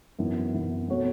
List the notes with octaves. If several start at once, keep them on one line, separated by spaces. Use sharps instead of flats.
F#2 E3 B3 E4
F#2 E3 B3 E4
B2 A3 F#4 C#5